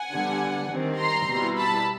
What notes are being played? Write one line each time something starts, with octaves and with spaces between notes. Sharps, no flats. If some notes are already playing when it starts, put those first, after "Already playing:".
Already playing: F#5 G#5
D3 G3 B3 D4
D#3 G3 C4
A#5 C6
B2 G3 B3 E4
A5 B5